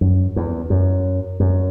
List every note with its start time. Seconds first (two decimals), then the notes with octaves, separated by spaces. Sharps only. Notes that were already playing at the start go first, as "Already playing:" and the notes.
0.01 F#2
0.36 E2
0.70 F#2
1.40 F#2